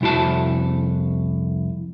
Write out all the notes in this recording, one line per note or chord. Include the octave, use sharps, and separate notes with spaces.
C2 F2 E4 F#4 A5